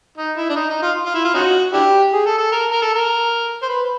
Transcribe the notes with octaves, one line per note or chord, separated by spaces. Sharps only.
D#4
E4
D4
D#4
D#4
F4
F4
E4
F4
C#4 D#4 F#4
D4 E4 G4
G#4
A4
A4
A#4
A#4
A4
A#4
C5
B4